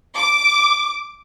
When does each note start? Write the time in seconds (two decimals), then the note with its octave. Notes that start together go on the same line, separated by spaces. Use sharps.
0.16 D6